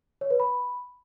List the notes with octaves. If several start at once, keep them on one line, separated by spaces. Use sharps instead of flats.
C#5
B4
B5